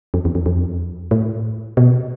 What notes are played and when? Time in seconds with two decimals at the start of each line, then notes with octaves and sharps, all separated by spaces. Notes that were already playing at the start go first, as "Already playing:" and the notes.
0.14 F2
0.25 E2
0.35 F2
0.46 F2
1.11 A2
1.77 B2